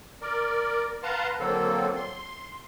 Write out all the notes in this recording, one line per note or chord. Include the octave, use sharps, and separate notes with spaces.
A#4 D5
B4 F5 F#5 A5 A#5 C6
D3 F#3 A#3 C4 A4
C6